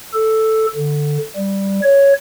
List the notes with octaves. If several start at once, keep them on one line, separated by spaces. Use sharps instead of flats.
A4
D3
G3
C#5